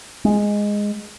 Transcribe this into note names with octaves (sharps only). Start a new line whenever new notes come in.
G#3